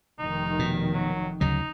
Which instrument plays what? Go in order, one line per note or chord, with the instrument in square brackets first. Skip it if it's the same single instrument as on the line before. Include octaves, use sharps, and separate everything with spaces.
[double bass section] F1 D#3 [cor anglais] D#4
[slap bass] B2
[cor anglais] F#3
[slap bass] D2 C#3 F#3 [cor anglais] D#4